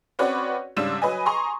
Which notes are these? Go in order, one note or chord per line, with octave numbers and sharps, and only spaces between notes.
C4 C#4 F#4 B4 C#5 D5
G#2 C#3 G3 D4 E6 E7
F#3 B4 D#5 G#5
G#5 A#5 C6 C#6 D#6